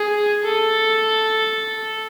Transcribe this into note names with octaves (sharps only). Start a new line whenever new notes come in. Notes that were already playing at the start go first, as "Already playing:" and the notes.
Already playing: G#4
A4